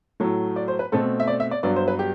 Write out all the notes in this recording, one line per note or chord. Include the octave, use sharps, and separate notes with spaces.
A2 F#3 A3
D5
C5
B4
B2 A3 C4 A4
E5
D5
E5
D5
G2 F#3 B3 D5
C5
B4
G4